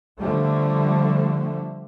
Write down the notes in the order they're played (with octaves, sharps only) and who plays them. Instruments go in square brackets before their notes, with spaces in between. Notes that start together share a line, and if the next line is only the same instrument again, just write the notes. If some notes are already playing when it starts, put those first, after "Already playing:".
[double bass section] D3 F3 G3 A3